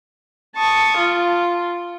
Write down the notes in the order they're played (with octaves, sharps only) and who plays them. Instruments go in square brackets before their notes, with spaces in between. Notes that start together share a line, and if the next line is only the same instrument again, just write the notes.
[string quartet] A5 C#6 D#6
F4